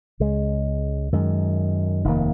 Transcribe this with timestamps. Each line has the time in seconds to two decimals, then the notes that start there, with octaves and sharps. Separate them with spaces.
0.20 C#2 C#3 G#3
1.12 F#2 D#3 G#3
2.05 F1 D#2 D#3 A#3